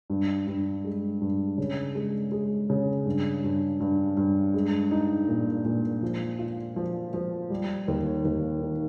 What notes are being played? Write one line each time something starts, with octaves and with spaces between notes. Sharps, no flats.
G2
G2
G#3
G2
C#3
G#3
G#3
C#3
G2
G2
G2
G2
G#3
D#4
A#2
A#2
F3
F4
F3
F3
G3
D#2
D#2
D#3